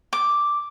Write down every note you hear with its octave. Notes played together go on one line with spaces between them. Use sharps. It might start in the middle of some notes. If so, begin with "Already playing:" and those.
D6